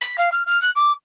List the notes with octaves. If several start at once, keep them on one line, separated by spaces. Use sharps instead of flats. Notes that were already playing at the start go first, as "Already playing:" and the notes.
B6
F5
F6
F6
F#6
D6